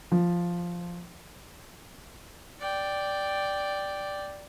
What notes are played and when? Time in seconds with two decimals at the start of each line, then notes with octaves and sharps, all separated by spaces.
0.12 F3
2.60 D5 G5